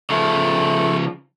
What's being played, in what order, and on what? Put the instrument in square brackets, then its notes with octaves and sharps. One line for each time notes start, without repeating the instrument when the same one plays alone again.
[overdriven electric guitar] C#3 F3 [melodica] A3